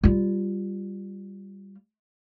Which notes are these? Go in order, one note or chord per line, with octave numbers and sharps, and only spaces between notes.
G3 F4